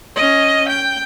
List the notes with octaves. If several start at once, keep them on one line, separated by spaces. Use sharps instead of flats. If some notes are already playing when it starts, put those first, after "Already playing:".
C#4 D#5
G5